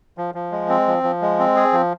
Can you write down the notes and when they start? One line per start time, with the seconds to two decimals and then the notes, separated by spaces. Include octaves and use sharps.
0.18 F3
0.35 F3
0.52 G#3
0.69 C4
0.87 F3
1.03 F3
1.22 G#3
1.39 C4
1.56 G#4
1.73 F3